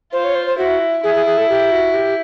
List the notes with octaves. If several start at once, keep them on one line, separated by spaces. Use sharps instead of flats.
F4 C5
C#5
C5
C5
E4 F#4
E4 G#4
G#4
G#4
A4
G4
F#4
G4